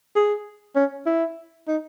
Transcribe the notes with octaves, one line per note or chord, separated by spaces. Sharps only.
G#4
C#4
E4
D#4